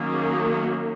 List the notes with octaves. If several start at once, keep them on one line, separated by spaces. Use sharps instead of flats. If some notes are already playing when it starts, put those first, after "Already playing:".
Already playing: D#3 F#3 A#3 C#4
G#4
F#4